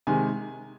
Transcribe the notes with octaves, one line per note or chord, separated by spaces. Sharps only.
C3 D#3 G#3 G#5